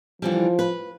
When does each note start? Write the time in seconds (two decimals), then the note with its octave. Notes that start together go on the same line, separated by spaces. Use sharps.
0.22 D3 E3 F3 G3
0.59 B4